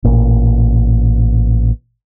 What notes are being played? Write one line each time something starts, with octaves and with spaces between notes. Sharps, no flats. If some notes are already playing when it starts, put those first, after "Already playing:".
A1 A#2